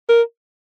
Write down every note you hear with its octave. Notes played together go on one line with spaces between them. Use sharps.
A#4